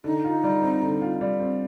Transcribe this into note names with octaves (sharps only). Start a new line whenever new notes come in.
D3 D#4
F4
G3
C4
D3
F4
G3
C4